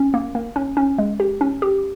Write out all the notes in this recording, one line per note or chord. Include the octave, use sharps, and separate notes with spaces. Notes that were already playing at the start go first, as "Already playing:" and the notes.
Already playing: C#4
A#3
A#3
C#4
C#4
G#3
G4
C#4
G4